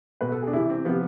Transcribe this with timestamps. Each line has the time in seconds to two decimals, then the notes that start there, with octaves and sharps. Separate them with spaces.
0.21 B2 B4
0.32 A4
0.43 D4 G#4
0.53 C3 E3 E4
0.69 C4
0.85 C3 F3 B3